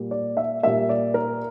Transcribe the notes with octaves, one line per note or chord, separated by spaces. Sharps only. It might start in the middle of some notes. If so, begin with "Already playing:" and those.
Already playing: A#2 G3 A#3
D5
E5
A#2 G3 A#3 E5
D5
A#4